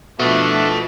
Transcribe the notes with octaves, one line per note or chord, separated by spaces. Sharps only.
F2 B2 F3 A3 D4 E4 A4 B4